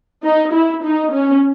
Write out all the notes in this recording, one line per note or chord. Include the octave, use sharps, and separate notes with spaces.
D#4
E4
D#4
C#4